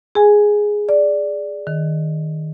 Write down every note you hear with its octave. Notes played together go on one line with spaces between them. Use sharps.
G#4 G#5
D5
D#3